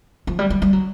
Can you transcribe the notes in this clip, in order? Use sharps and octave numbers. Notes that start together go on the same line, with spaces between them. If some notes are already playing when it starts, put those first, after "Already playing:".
F3
G3
G3
G3
F#3